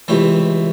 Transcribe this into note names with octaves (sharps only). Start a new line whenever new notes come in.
C#2 C3 E3 A3